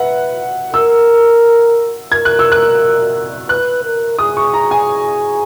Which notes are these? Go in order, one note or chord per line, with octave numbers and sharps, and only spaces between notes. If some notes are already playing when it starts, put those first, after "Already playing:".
Already playing: B4 E5 F#5
A#4 E6
A#4 G#6
F#6
E6
F#6
B4 F#6
A#4
G#4 D#6
C#6
A#5
G#5